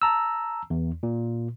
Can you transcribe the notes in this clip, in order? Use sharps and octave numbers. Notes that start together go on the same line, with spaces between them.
A5 A#5 E6
E2
A#2